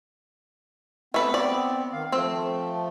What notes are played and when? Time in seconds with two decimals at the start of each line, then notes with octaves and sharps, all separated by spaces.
1.14 A3 B3 C4 B4
1.34 D5
1.93 D#3 F5
2.12 F3 A3 C4